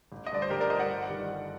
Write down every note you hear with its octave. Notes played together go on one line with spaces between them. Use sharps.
A1
D#5
G2 D3 D5
C5
A1 G4 A#4
A#4 D5
G2 D3 C5 D#5
D5 F#5
G1
G2 D#3 G3
G1